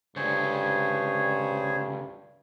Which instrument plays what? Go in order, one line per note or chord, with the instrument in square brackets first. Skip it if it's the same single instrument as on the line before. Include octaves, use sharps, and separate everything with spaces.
[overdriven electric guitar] C#2 D3 [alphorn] G2 [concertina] G#4 C5 C#5